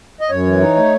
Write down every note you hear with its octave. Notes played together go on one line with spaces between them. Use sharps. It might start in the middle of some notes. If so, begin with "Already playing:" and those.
D#5
F#2 C#5
E3
D#4
A3